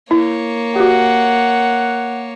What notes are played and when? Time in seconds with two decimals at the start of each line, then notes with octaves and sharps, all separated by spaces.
0.11 A#3 E4 C#5
0.76 F#4 G4 F#5